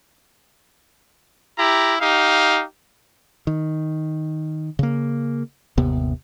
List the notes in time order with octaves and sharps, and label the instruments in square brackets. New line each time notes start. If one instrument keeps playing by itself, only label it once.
[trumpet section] E4 G4 A#5
D#4 G4 F5
[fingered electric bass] D#3
C#3 A#3
G1 D#2 C3 B3